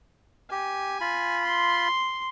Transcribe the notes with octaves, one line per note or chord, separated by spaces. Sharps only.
G4 G#5
F4 B5
C6